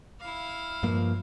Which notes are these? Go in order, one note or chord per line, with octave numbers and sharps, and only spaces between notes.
E4 F5
G2 F3 A#3